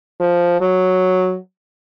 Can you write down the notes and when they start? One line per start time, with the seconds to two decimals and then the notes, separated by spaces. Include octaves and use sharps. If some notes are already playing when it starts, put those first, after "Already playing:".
0.20 F3
0.61 F#3